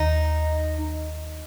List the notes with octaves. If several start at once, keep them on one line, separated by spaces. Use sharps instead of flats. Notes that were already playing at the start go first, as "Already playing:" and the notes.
Already playing: D#2 D#3 D#4